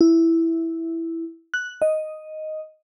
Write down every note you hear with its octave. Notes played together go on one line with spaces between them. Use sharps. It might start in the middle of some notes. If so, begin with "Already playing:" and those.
E4
F#6
D#5